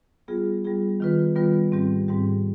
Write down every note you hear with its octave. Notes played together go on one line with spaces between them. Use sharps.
G3 B3 F4 G#4
G3 B3 F4 G#4
D#3 G3 B3 F4 B4
D#3 G3 B3 F4 B4
G#2 G3 C4 G4
G#2 G3 C4 G4